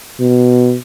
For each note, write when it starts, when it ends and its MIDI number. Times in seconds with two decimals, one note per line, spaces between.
0.20 0.76 47